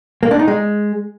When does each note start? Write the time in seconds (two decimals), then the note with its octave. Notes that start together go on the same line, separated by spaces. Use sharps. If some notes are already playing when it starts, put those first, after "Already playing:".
0.23 A#3
0.31 D4
0.39 D#4
0.48 G#3